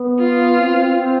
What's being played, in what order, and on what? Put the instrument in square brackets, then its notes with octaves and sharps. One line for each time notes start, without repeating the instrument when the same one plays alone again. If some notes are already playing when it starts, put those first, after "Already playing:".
Already playing: [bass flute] B3
[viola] F4
[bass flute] C4
C4